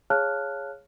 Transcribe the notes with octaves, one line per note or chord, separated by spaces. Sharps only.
G#4 C#5 F5 A5 F6 F#6